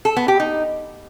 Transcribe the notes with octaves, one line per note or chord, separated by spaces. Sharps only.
A4
B3
G4
D#4